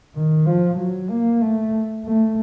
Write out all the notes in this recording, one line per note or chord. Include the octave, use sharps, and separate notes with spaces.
D#3
F3
F#3
A#3
A3
A3